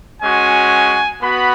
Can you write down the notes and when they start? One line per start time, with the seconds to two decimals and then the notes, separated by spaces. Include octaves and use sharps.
0.21 G#3 C#4 F#4 G#5
1.21 B3 F#4 B5